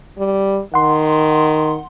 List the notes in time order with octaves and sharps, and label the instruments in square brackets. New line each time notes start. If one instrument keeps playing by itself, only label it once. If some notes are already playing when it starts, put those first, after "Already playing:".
[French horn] G3
[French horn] D#3 [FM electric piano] F#5 C6